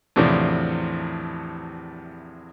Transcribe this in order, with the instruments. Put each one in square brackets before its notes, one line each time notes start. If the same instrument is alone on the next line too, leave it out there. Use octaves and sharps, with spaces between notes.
[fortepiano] E2 A2 C3 F3 D4